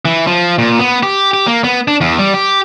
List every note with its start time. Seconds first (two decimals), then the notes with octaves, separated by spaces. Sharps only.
0.05 E3
0.27 F3
0.58 A#2
0.79 B3
1.03 G4
1.33 G4
1.47 A#3
1.64 B3
1.88 D4
2.01 E2
2.19 G3
2.34 G4